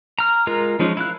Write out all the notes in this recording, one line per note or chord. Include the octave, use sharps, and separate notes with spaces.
A#5 F6
G#3 F4 A#4 A#5
F3 G#3 C#4 D#4
E4 F5 F#6